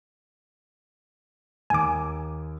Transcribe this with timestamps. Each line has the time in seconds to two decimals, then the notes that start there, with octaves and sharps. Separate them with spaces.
1.70 D#2 G#5 D6